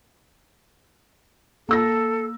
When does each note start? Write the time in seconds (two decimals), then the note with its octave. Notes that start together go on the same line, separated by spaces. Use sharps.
1.69 A#3 A4 E6 A#6